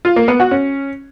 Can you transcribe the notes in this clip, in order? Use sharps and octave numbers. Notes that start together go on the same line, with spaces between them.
F4
A#3
B3
F#4
C#4